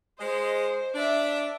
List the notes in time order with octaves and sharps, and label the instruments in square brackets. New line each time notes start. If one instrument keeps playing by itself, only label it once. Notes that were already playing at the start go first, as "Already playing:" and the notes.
[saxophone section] G#3 D#5 [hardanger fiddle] C5
[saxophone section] D4 [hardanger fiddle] E5 D6